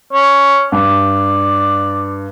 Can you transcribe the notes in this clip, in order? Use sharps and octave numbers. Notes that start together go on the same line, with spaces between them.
C#4
G2 D5